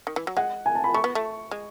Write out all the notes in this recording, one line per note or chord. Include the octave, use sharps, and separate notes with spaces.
D#3
E3
F#3
G#3 F#5
G#5
A5
B5
A3 C#6
B3
A3
G#3